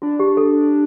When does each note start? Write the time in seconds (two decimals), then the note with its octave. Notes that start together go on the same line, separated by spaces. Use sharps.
0.02 D4 F4
0.19 G4
0.37 A4